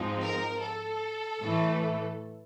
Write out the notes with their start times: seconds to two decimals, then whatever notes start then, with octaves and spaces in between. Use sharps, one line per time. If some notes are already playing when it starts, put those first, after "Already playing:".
Already playing: G#2 F3 G#3 C4 D#4
0.21 A#4
0.61 A4
1.41 A2 E3 A3